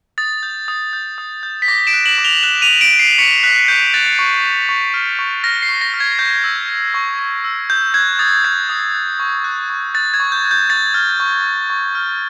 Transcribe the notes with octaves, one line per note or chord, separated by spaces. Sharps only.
D#6 A6
G6
D#6
G6
D#6
G6
B6
D6 A#6
D7 E7
F#6
E7 F#7
D6
F7 G7
F#6 E7 F#7
D#7 F7
D6
D7 E7
F#6
C7 D7
C#6 B6 C#7
F#6 B6
C#6 G6
F#6 A6
C#6
F#6
C#6
F6
C#6
F6 A#6
C7
C#6
A#6
F6
G#6
C#6 G6
E6
G6
C#6
C#6
E6
D#6 G6
F#6 G#6
D#6 A6
F#6 G#6
D#6
F#6
C#6
F#6
C#6
F#6 A6
G#6
C#6
G6
F#6
G6
C#6 A6
F6 A6
C#6
F6
C#6
F6